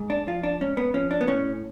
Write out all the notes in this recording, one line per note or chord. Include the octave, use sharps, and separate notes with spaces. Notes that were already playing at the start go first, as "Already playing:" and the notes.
Already playing: G#2
D4
F3 F4
D4
G#2 C#4
B3
F3 C#4
D4
B3
A2 C#4